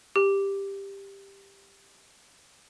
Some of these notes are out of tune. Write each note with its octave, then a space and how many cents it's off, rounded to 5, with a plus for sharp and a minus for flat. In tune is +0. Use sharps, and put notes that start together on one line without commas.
G4 +10